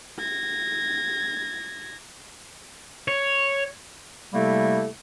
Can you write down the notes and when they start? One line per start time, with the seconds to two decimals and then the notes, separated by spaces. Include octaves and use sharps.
0.19 G#6 A#6
3.08 C#5
4.33 C3 G3 A3 A#3 E4 A4